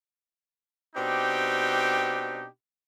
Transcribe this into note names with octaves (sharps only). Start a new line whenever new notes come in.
B2 C4 D4 D#4 G4